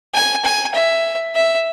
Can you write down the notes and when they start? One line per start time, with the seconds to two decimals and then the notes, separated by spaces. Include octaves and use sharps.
0.15 G#5
0.45 G#5
0.75 E5
1.36 E5